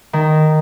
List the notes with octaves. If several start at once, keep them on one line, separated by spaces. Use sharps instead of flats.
D#3